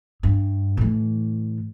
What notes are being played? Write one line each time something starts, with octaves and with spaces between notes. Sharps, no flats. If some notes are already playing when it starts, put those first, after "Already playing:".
G2
A2 E3